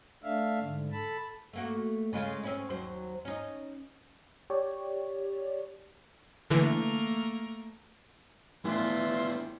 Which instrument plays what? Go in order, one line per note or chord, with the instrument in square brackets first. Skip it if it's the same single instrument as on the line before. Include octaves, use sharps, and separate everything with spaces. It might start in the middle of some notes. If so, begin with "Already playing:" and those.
[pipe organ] A3 D4 E5 F5
G#2 D3
A4 A5 B5
[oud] A3 A#3 F#4
C#3 G#3 F4
C4 C#4 E4
D#2 F#3 C5
C#4 D#4
[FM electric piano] G4 C#5 D5
[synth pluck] D3 E3 [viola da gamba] A3 A#3 A#4
[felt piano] A2 E3 [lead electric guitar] B3 D4 [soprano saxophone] F4 [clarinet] E5